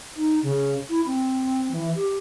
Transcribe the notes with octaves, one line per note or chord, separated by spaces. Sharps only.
D#4
C#3
E4
C4
E3
G4